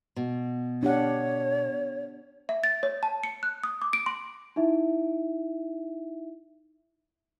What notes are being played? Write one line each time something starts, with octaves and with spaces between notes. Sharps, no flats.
B2
D4 G4 C#5 F#5
E5
A6
C#5
A5
C#7
F#6
D#6
D6
D7
C6
D#4 E4 E5